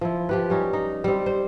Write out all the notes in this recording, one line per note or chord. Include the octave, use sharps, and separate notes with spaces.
F3 E4
F3 G4 B4
G3 C#4 D#4
D#4
G3 C4
C5